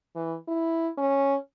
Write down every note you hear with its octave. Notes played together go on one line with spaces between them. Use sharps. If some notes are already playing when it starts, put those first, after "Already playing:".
E3
E4
C#4